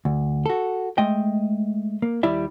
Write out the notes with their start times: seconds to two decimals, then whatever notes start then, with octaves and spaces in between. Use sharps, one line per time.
0.05 D2
0.46 F#4 A4
0.98 G#3 A3 D#5 G5
2.02 A#3
2.23 D#2 G3 E4 D5 E5